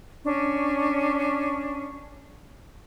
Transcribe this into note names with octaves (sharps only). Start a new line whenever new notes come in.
C#4 D4 C#6